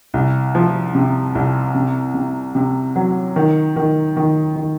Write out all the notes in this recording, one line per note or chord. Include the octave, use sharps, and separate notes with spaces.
C2
F3
C3
C2
C3
C3
C3
F#3
D#3
D#3
D#3
D#3